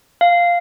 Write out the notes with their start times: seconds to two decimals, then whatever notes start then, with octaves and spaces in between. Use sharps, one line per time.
0.21 F5